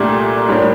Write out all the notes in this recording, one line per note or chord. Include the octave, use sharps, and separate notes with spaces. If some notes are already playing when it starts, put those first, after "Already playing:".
Already playing: C2 A#2 A3 D4 G4
A2 G3 A#3 D4 G4